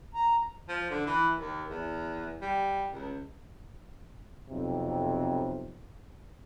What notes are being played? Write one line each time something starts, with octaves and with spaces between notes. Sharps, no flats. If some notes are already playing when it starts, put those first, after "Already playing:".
A#5
F3
D3
E3
D#2
E2
G3
C#2
B1 F2 C3